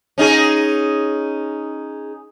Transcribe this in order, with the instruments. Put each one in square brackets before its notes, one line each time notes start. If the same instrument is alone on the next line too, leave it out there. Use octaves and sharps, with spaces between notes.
[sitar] C#4 D#4 G#4